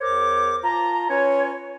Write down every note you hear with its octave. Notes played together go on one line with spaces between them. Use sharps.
E2 A#4 C5 C#5 D6
F4 A5 A#5
C#4 F4 B4 C#5